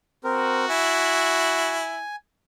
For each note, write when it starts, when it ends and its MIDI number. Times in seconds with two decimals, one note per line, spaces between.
0.24 0.65 60
0.24 1.84 66
0.24 0.65 70
0.69 2.02 64
0.69 2.16 80